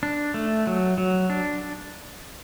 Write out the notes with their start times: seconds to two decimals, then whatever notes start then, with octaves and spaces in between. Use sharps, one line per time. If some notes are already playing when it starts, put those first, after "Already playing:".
0.03 D4
0.34 A3
0.67 F#3
0.98 F#3
1.30 D4